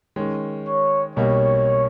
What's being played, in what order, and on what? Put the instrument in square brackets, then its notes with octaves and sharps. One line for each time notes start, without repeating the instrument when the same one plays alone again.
[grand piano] D#3 G#3 C#4
[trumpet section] C#5
[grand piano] B1 B2 G3 A#3 [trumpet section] C#5